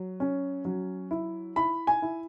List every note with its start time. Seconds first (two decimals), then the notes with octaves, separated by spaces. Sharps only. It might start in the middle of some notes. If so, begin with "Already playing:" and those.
Already playing: F#3
0.20 C#4
0.65 F#3
1.11 E4
1.56 E4 B5
1.87 G#5
2.02 E4